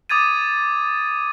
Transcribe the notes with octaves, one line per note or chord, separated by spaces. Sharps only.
D6 D#6 G#6 A6 D#7